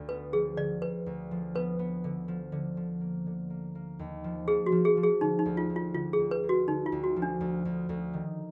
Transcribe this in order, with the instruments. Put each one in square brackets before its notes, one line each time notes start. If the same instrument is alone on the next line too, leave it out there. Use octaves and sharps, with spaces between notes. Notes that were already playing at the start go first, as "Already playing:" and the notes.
Already playing: [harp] D2 D3
[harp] B3 [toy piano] B4
[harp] F3 [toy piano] G#4
[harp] D3 [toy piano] D5
[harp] D2 [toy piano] B4
[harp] D2
F3
[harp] B3 [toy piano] B4
[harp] B3
D3
F3
D3
F3
A#3
D3
A#3
A#3
D#2
F3
[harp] F3 [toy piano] G#4
[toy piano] F#4
[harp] F3
[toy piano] G#4
[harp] F3
[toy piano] G#4
[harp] D3 [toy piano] D#4
[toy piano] D#4
[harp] D2
[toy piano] F4
[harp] D2
[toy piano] F4
[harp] D3 [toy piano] F4
[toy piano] G#4
[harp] D2
[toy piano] B4
[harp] D2
[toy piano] F#4
[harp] D3 [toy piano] D#4
[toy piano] F4
[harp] D2
[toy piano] F#4
[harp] F3
[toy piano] D4
[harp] D2
D2
D2
D#3